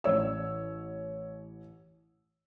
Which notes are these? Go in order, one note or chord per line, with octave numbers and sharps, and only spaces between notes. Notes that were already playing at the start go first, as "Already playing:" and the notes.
A1 C#5 E6